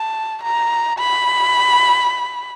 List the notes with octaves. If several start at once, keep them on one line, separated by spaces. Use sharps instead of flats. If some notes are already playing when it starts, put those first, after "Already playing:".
Already playing: A5
A#5
B5